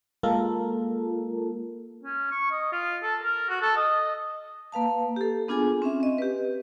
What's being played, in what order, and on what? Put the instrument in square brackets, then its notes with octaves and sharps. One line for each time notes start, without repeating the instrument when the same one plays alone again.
[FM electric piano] G#3 A#3 F4 A4 A#4
[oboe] C#4
C#6
D#5
F4
A4
A#4
F#4
A4
D#5
[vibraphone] A#3 B4 F5 A5
G4 A4
B3 D4 F4 G#4 G#5
C4 C#4 E5
C4 D#5
G4 B4